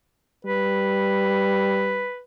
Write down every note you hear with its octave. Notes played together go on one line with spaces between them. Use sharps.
G3 B4